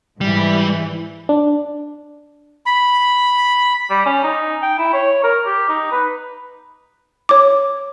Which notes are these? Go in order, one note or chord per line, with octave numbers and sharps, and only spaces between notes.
G#2 E3 G3
D4
B5
G3
C#4
D#4
G5
E4
C#5
A#4
G4
D#4
B4
C#5 D6